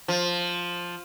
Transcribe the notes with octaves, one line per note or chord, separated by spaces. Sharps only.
F3